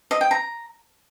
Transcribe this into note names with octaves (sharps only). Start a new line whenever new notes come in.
D#5
G5
A#5